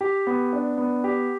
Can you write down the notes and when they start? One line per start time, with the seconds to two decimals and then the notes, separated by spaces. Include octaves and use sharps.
0.01 G4
0.27 B3
0.53 D4
0.78 B3
1.04 G4